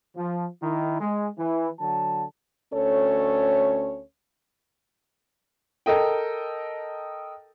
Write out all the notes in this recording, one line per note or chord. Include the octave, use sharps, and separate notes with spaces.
F3
D#3 E4
G#3
E3
D3 F#3 A5
D2 C#4 A4 C#5
A4 A#4 D#5 G5